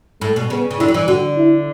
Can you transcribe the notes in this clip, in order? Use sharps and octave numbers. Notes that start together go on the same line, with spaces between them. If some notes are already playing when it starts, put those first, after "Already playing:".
A2 A3
B2
C#3 B3
C#3
D3 E4
F#3
E3
D3 F#4
E4